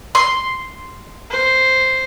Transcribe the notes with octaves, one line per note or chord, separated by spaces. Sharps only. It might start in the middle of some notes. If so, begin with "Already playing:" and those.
C6
C5